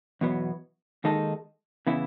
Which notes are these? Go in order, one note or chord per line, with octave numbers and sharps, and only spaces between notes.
E2 B2 F#3 B3
D#2 D#3 G#3 D#4 A4
C#3 E3 B3 E4